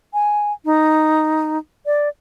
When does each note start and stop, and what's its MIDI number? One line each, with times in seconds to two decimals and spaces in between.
0.14 0.53 80
0.65 1.58 63
1.86 2.09 74